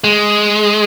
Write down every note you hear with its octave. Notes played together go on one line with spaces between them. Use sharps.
G#3